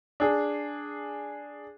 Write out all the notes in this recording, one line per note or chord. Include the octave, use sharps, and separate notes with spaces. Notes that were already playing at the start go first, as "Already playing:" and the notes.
D4 G#4